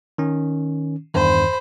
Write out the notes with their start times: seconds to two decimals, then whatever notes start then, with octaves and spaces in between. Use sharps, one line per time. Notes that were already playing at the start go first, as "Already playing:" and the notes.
0.18 D#3 C#4
1.14 E2 G2 D#3 C5 B5